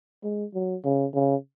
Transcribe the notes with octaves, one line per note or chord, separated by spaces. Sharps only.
G#3
F#3
C#3
C#3